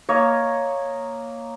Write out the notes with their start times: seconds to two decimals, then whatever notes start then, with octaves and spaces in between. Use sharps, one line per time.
0.09 A#3 C#5 D#5